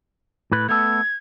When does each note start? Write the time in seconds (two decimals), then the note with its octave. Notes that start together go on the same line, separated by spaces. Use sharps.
0.52 A2 B4
0.69 A3 B3 A4 G#6